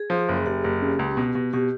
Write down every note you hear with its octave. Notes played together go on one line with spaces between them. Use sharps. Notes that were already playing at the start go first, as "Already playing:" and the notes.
Already playing: G#4
F3
G#4
F#1
F#1 G4
F#1
C#3
C#2
B2
B2
B2 G4